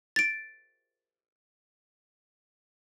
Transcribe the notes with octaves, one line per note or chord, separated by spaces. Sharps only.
A6 D7